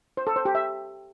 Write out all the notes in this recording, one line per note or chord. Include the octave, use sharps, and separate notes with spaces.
C5
A4
C5
G4
E5